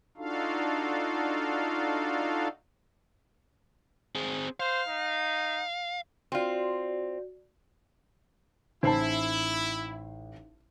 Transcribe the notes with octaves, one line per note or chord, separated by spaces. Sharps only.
D4 D#4 F4 F#4 A4 F5
C4 G#4
C5 F5
D#4
C4 F4 F#4 D5
A1 D#4 E4 C5 A5 C7